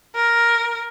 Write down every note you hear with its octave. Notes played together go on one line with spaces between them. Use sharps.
A#4